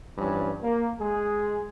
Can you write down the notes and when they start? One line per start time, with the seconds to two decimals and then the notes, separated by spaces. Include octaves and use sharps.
0.18 G2 E3 F3 C#4
0.63 A#3
1.00 G#3 G#4